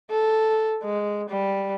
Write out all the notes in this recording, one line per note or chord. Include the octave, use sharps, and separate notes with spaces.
A4
G#3
G3